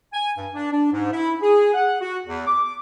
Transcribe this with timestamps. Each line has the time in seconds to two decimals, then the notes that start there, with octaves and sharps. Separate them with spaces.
0.13 G#5
0.37 G2
0.54 D4
0.72 D4
0.91 G#2
1.12 E4
1.42 G#4
1.74 F#5
2.00 F#4
2.26 E2
2.47 D6